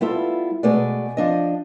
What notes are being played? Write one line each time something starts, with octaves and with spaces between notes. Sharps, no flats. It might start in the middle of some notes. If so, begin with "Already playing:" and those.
G3 B3 E4 F4 A4
B2 G#3 A3 G#4 B4 D5
F3 D4 D#5